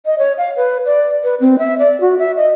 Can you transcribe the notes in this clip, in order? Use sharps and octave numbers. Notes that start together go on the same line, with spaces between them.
D#5
C#5
F5
B4
D5
B4
C4
E5
D5
F#4
E5
D#5